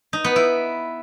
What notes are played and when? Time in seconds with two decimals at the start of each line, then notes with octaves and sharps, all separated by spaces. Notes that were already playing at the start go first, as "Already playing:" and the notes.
0.13 D#4
0.24 B3
0.36 E4